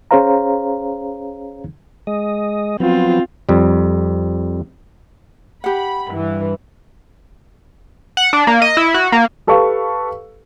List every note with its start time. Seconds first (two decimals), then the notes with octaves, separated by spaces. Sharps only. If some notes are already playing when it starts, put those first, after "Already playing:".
0.11 C#4 G#4 C5 C#5 F5 A#5
2.07 G#3 D#5
2.80 F3 F#3 B3 C4 F4
3.49 F2 G3
5.64 G4 F#5 B5
6.09 G2 E3
8.17 F#5
8.33 D4
8.47 A#3
8.62 D#5
8.77 E4
8.94 F#4
9.12 A#3
9.47 G4 A4 B4 F5 C#6